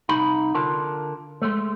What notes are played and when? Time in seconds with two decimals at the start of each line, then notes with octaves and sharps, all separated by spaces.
0.09 C2 D#4 B5
0.55 D3 F4 A#4 A5
1.42 G#3 A3